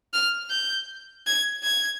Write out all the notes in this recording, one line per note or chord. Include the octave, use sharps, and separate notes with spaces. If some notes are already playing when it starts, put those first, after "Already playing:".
F6
G6
G#6
G#6